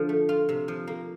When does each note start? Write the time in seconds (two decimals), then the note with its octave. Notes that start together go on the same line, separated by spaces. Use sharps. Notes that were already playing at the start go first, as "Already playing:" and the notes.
Already playing: D3 F3
0.09 A3
0.29 F4
0.49 C3
0.68 F3
0.87 A#3